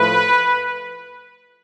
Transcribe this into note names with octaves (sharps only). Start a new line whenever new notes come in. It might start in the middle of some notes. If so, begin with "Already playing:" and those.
Already playing: A2 F3 A3 B4